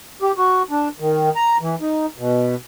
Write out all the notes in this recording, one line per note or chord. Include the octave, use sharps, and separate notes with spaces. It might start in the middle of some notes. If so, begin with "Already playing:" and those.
G4
F#4
D4
D#3
A#5
E3
D#4
B2